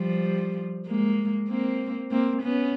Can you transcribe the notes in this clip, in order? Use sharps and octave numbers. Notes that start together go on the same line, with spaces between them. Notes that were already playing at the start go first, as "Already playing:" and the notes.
Already playing: F3 G3
G#3 A#3
A#3 C4
A#3 C4
B3 C#4